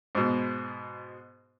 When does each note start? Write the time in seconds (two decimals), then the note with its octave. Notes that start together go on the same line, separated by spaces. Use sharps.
0.15 G#2 B2